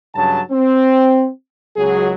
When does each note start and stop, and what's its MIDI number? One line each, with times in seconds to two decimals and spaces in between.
0.15 0.41 43
0.15 0.41 49
0.15 0.41 54
0.15 0.41 81
0.51 1.28 60
1.76 2.14 37
1.76 2.14 54
1.76 2.14 68